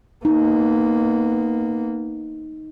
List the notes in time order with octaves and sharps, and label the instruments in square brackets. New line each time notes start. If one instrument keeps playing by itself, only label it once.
[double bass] A#3 B3 [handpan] D#4